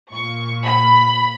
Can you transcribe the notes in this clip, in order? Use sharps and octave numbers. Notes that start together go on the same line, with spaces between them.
A#2 C#6
B5